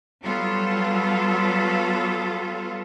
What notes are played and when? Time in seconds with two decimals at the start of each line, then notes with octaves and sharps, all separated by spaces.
0.23 F#3 G3 B3 F4 A4